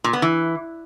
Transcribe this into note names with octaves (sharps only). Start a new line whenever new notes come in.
A#2
B3
E3